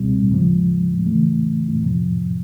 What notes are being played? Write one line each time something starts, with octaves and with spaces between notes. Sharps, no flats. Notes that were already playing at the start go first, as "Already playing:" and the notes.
Already playing: C#2 B2 G3 C4
D#2 C#3 F3 G#3
C#3 E3 A3
F2 C3 F3